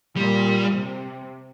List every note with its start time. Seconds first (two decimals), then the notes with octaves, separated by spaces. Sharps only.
0.16 A#2 G3
0.73 C3